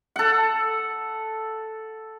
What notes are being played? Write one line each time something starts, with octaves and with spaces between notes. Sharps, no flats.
A4 F#5